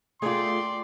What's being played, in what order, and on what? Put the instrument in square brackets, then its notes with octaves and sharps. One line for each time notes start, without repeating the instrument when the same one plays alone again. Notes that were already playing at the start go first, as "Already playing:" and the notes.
[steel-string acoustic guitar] A3 F4 [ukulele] G#4 [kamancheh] D5 G5 [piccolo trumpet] C6